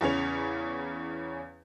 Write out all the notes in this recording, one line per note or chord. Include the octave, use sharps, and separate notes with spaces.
E2 C#3 C#4 F7